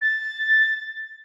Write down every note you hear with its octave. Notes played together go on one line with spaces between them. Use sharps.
A6